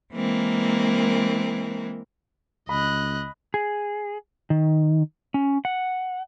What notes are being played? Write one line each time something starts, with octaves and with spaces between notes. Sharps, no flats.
E3 G#3 A#3 C4 A#4
C#2 D#5 B5 F#6
G#4
D#3
C#4
F#5